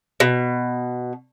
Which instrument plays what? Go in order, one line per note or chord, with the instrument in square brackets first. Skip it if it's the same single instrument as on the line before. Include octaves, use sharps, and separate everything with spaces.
[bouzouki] B2